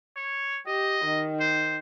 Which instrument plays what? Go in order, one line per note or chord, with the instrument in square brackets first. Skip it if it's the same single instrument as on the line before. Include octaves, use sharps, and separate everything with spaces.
[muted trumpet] C#5
[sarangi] G4 [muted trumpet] D#5
[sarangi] D#3
[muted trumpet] C5